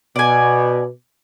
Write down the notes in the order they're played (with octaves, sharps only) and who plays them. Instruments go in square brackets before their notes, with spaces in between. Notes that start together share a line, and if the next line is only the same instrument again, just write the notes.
[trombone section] B2 [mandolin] D5 G#5